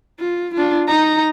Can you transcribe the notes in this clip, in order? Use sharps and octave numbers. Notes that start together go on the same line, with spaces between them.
F4
D4 F4
D#4 A#5